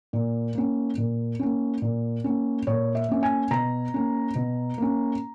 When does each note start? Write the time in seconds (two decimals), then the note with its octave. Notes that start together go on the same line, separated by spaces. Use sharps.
0.13 A#2
0.55 A#3 C#4
0.97 A#2
1.39 A#3 C#4
1.82 A#2
2.24 A#3 C#4
2.67 A#2 C#5
2.95 E5
3.09 A#3 C#4
3.23 G#5
3.51 B2 A#5
3.94 A#3 C#4
4.35 B2
4.78 A#3 C#4